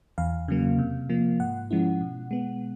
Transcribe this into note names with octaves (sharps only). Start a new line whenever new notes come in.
E2 F5
C#3 F#3 A#3
C3
F3 A#3
G#2 F#5
F3 G#3 C#4 E4
B2
G#3 B3